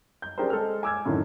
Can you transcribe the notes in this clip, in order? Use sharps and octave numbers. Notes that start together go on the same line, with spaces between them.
G6
C#4 D4 G4 G#4 A#4 C5
G#3 A4 C5 F6
G#5 D6 E6 F6 G#6
F#2 A2 D3 D#3